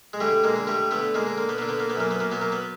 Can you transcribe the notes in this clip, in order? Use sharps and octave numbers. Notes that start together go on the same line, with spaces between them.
G#3
D3 G3 A3
G#3 A#3
D3
G3 A3
D3 A3 B3
G#3 A#3
D3
A#3
B3
D3 A#3
B3
A#3
B3
F#2 A#3
B3
A#3
F#3 B3
A#3
B3